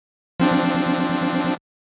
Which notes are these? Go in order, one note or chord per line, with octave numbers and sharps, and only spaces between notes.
F3 C4 D4